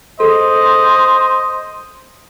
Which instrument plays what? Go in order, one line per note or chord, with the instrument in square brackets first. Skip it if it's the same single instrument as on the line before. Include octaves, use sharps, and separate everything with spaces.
[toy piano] G#4 A4 [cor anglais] C5 [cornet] D#5